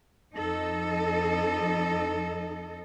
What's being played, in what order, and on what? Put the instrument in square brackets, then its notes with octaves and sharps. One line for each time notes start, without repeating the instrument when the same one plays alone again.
[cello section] F2 D#4 A4 D#5